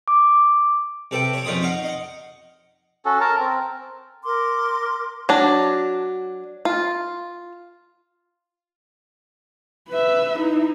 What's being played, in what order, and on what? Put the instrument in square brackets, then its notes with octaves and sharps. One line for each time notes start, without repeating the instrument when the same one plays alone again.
[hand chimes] D6
[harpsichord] C3 A4 B4 G5
C#5 D6
F2 C#3 D#4 F4 B5 D#6
D#4 D#5 F5 F#5
D#5 F#5
[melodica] C#4 F#4 A4
A#4 A5 A#5
C4
[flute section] A#4 C6 D6
[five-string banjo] F#3 D4
F4
[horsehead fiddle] B4 E5
D#4 E4